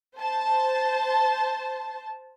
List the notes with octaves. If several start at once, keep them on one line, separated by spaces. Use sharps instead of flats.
C5 A5